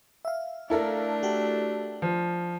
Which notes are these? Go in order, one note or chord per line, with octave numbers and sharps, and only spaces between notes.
E5 F5
A3 D4 E4 A4 A#4
F#4 G4
F3